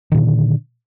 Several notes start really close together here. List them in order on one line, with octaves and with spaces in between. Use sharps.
D#3 A#2 D3